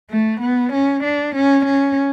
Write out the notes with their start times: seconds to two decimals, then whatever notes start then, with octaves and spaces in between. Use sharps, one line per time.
0.10 A3
0.41 B3
0.73 C#4
1.04 D4
1.36 C#4
1.66 C#4